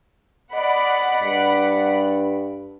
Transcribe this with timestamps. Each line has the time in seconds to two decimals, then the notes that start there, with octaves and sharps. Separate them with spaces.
0.54 D5 D#5 F#5 B5
1.23 G2